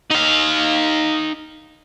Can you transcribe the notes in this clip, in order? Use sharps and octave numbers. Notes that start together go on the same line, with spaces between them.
D#4 F5